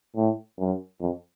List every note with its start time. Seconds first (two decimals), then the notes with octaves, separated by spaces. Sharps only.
0.16 A2
0.58 F#2
1.01 F2